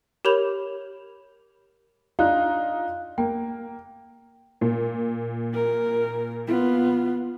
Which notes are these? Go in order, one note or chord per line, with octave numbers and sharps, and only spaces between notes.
G4 A#4 C#5 B5 G6 F7
D4 D#4 F4 F5 F#6
A#3 G5
A#2
A#4
B3 F4